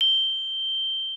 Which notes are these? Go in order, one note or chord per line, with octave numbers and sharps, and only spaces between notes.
G7